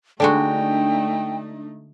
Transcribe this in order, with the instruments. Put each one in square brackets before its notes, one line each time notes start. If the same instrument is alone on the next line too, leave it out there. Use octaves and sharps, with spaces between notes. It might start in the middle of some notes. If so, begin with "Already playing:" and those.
[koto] D3 G#3 F#4 [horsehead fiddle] A3 D#4 [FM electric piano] D4 [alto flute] G5